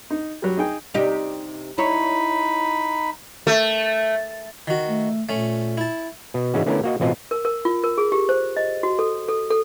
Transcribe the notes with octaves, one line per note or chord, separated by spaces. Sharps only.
D#4
F#3 G3
D#4 G#4 G5
C3 D#4 G4
D#4 E4 C#5 B5
A3
D#3 F#4
A3
A#2 A3 C#4
E4 A5
B2
G#2 E3 G#3 C#4 F#4
D3 A3 B3 C#4 E4 A#4
A#3 F#4 D#5
A1 B2 C4 F4 D#5 A5
A#4
A#4
F4
A#4
G#4
G4
C5
D#5
F#4
A4
A4
A4